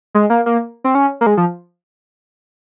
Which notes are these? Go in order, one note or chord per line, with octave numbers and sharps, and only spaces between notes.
G#3
A#3
A#3
C4
C#4
A#3
G#3
F3